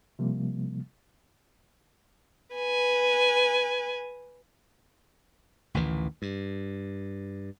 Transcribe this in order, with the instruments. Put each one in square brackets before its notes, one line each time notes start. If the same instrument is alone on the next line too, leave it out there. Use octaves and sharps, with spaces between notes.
[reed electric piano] C3 F3 G3 A#3
[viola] B4 G#5
[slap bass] A1 D2 D#3 E3
G2